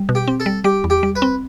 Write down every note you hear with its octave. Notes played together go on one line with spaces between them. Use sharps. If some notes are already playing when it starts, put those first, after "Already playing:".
Already playing: G3
B2
G4
C4
A4
G3
G3 G4
E2
G4
G3
B4
C4